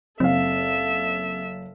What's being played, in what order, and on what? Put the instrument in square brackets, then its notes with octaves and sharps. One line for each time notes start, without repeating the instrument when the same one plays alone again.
[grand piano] F#1 F5 [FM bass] C4 [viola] A4 E5